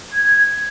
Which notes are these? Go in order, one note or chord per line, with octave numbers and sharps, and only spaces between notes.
G#6